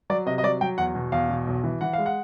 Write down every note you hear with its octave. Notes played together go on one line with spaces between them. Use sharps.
F#3 D5
C3 D#5
D#5
F#3 D5
F#3 G5
E2 F#5
B2
E2 F5
B2
B1
E3
E3 F#5
G#3 F5
F#5